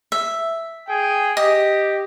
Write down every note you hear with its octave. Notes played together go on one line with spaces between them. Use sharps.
E5
G#4 G5
G4 D#5